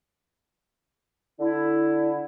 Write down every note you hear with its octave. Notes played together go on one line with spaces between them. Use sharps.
D3 E4